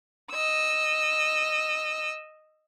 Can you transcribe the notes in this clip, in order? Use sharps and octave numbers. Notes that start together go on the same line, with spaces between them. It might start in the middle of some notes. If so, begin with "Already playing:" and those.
D#5 E6